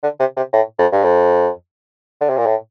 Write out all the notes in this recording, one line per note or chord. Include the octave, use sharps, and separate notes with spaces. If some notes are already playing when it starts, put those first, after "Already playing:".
D3
C3
C3
A2
F2
G2
F2
D3
C3
A#2
A2